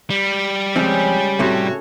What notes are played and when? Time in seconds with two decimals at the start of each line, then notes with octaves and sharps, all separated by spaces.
0.10 G3
0.76 C#3 F3 G#3 C4 G5
1.39 A2 C3 A3 F#4 A4 C#5